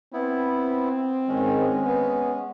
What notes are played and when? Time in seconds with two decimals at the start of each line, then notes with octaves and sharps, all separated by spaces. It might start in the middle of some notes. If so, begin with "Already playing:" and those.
0.13 B3 C4 E4
1.28 G#2 D#3 G#3 C#4
1.82 B3